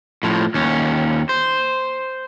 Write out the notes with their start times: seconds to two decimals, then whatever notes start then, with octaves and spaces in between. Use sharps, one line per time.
0.23 A2 F3
0.54 D#2 C#4
1.29 C5